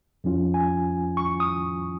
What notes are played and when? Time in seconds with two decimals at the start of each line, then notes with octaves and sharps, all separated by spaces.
0.24 F2 F3 C#4 F4
0.54 G#5
1.17 C#6
1.40 D#6